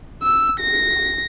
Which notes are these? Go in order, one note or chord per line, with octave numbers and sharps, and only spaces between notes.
E6
A#6